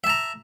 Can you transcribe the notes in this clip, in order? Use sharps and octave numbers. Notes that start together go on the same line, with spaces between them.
E5 A5 A#5